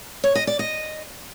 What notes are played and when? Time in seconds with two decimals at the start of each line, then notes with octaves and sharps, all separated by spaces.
0.24 C#5
0.35 D#5
0.47 D5
0.59 D#5